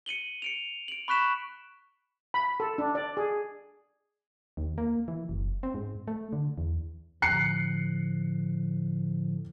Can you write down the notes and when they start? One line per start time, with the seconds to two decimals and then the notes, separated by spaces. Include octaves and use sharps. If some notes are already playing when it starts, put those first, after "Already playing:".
0.06 C#7 D#7 F#7 G7
0.42 C#7 D7 F7
0.88 D7 F#7
1.08 B5 C#6 F#6 B6 E7
2.34 B5
2.60 A4
2.78 D4
2.95 D5
3.17 G#4
4.57 D#2
4.78 A#3
5.08 E3
5.29 F#1
5.63 C4
5.74 G#2
6.08 A3
6.33 D3
6.58 E2
7.22 A2 D3 F3 F#6 C7 C#7